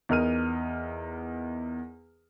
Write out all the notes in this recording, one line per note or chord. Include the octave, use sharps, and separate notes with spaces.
E2 D#4 A#4 F6 D#7